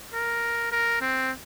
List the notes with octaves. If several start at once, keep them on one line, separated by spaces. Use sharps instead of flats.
A#4
A#4
C4